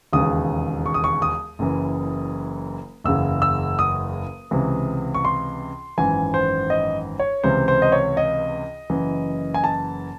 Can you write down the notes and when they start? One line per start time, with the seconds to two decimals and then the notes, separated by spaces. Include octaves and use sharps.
0.13 E1 D#2 C#3 E3 D#6
0.86 C#6
0.94 D#6
1.04 C#6
1.22 D#6
1.59 F#1 F#2 E3
3.04 F#1 E2 C#3 E6
3.42 E6
3.79 D#6
4.51 C#2 C3 E3
5.15 C#6
5.25 C6
5.98 G#1 F#2 E3 G#5
6.34 C5
6.70 D#5
7.19 C#5
7.44 C#2 C3 E3 C5
7.68 C5
7.82 D#5
7.92 C#5
8.17 D#5
8.90 F#1 F#2 E3
9.54 G#5
9.64 A5